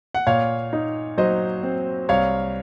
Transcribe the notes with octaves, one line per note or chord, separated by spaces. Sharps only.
F#5
A#2 C#5 F5
D#4
F#3 C5 D#5
C4
C2 C#5 F5